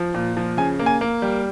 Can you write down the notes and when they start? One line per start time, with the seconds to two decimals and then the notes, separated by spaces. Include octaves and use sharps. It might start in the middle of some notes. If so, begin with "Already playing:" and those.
Already playing: F3
0.14 A#2
0.37 F3
0.57 C#3 G#5
0.79 A#3
0.86 G#5
1.01 A#3
1.22 G3